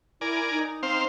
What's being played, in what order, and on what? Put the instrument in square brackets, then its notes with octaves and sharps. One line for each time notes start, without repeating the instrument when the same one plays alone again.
[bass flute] E4 [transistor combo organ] A#4 D5 G#5
[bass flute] D#4
[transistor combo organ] C4 C5 F5